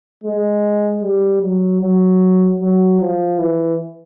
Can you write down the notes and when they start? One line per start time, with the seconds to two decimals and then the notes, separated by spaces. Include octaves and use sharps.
0.24 G#3
1.03 G3
1.42 F#3
1.82 F#3
2.60 F#3
3.00 F3
3.39 E3